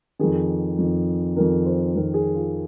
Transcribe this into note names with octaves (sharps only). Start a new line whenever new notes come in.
F2 D#3 G#4
F2 D#3
F2 D#3 A#4
C5
F2 D#3 A#4
G#4
F4